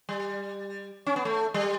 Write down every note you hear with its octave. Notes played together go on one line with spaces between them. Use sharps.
G3
C#4
B3
A3
G3